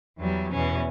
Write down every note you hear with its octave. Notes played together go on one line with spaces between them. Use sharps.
E2 F#3 G3
E2 B2 C#4